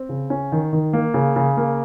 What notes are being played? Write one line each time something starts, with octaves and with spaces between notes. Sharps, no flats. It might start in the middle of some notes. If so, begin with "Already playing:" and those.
Already playing: C4
C#3
C#4
D#3
D#3
A#3
C#3
C#3
A#3